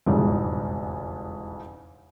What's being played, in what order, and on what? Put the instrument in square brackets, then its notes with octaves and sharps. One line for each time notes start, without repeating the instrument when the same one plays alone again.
[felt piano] E1 C2 F2 G#2 C#3